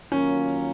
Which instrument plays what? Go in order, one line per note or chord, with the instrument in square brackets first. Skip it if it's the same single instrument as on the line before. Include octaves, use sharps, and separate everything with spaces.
[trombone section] D#3 F#3 A#3 F4 A#4 [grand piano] C#4